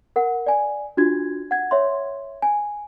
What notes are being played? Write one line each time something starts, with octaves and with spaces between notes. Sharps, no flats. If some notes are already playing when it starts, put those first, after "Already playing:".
A#4 F#5
D5 G#5
D4 F4 F#4 G#6
F#5 G#6
C#5 E5 C6
G#5